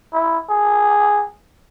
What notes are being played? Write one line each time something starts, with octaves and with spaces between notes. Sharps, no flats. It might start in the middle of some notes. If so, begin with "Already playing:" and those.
E4
G#4